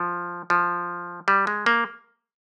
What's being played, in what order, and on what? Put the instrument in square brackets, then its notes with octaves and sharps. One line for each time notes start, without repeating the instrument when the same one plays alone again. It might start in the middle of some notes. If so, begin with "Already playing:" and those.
Already playing: [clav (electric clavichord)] F3
F3
G3
G#3
A#3